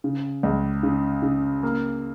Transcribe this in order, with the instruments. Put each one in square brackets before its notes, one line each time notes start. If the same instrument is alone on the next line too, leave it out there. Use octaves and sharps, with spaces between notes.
[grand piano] C#3
C#2
C#3
C#3
A#3